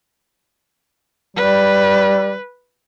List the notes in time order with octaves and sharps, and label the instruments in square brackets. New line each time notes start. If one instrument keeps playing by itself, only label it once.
[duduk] G3 [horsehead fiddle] B4